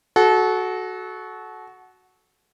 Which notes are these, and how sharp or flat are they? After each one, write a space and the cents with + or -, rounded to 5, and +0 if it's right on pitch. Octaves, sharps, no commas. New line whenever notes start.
F#4 +0 A4 -30